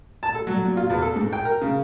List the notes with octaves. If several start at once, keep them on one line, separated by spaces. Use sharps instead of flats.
A5
A4
F#3
A#2
F4
E2
A4
G#2
G5
A#4
C#3